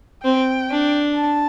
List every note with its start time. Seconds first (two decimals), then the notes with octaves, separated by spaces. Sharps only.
0.24 C4 G5
0.71 D4
1.15 A5